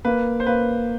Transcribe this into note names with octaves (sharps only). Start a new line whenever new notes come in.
A#3 B4
C5
A#3 B4